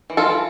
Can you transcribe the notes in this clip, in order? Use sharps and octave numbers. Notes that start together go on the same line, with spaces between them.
E3
F4 A4
E3